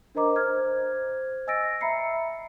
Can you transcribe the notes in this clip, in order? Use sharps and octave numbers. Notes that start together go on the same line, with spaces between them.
D4 A#4 C5 D#5 A#5 D6
C5 F6 G#6
D#5 G#5 E6 A6 A#6 D7
E5 A#5 B5 C7 C#7